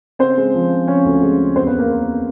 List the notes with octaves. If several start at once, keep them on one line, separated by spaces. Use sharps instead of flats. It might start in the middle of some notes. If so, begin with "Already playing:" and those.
C#3 C4 C5
G#3
F3
C#3
C#3 C#4 C#5
D2
G#3
C#3
E2 C4 C5
B3 B4
A#3 A#4